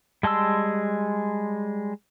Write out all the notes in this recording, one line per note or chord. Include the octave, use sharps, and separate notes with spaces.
G3 G#3 A5 C6 E6